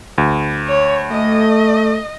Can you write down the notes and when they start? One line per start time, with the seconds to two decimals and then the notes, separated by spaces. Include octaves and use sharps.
0.18 D2
0.67 C#5
1.11 A3 D#5